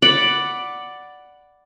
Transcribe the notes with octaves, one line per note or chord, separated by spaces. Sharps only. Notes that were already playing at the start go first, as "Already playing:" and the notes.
D5 F#5 B5